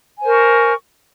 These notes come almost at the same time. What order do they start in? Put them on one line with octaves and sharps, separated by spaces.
G#5 C5 A#4 C#6